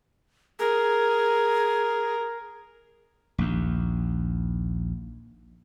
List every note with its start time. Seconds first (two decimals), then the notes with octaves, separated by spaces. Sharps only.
0.59 G#4 A#4
3.38 A#1 D#2